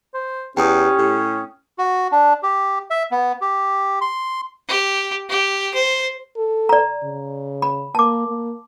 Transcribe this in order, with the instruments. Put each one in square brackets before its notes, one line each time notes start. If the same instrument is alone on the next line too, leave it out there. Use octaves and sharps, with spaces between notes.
[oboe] C5
[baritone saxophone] E2 [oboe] C#4 [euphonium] G4 [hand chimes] G5 D#6
[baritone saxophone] A2
[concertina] F#4
D4
G4
E5
B3
G4
C6
[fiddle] G4
G4
C5
[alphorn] A4
[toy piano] D5 A#5
[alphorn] C#3
[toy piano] B5
[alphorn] A#3 [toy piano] A5 D6
[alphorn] A#3